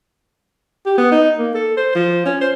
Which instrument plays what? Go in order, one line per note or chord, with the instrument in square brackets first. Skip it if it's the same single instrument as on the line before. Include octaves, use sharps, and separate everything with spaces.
[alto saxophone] G4
B3
D#4
A#3
A4
C5
F3
C#4
C5